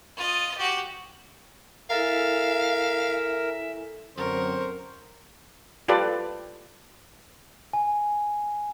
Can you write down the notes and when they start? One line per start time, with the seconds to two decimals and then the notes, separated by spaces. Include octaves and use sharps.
0.17 F4 D#5
0.58 F#4 G4
1.90 E4 A4 A#4 E5 F5 G#5
4.17 F#2 D3 C4 A#4 C5 C#6
5.88 F4 G4 A4 B4 D5
7.73 G#5